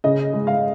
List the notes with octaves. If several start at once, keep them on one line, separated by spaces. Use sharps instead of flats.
C#3 D#5
G#3
F5